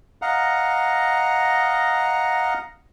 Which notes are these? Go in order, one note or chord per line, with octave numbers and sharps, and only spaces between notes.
D#5 F5 F#5 A#5